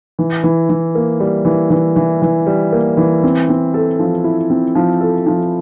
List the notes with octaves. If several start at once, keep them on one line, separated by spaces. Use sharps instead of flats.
E3
E3
E3
A#3
G3
E3
E3
E3
E3
G3
A#3
E3
C4
C4
A4
F3
E4
C4
F3
A4
F3